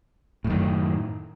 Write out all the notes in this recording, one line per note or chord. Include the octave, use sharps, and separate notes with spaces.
F#2 A2 D#3